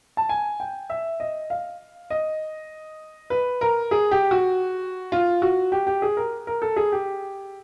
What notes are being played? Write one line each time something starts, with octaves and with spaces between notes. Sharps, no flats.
A5
G#5
G5
E5
D#5
F5
D#5
B4
A#4
G#4
G4
F#4
F4
F#4
G4
G4
G#4
A#4
A#4
A4
G#4
G4